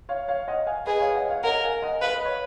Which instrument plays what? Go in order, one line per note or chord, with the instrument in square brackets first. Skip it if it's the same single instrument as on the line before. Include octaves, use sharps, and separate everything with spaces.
[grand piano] C#5 F5
C#5 F5
D#5 F#5
F5 G#5
[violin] G#4 [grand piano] B4 D#5
[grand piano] C#5 F5
D#5 F#5
C#5 F5
[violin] A#4 [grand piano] D#5 F#5
[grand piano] F5 G#5
D#5 F#5
[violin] B4 [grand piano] F5
[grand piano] D#5
C#5